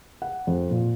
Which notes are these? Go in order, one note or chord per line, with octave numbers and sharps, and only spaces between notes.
F#5
F2
A#2